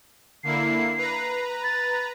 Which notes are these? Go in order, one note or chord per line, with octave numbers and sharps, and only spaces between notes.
D3 A#3 E4 C7
B4 A#5
A6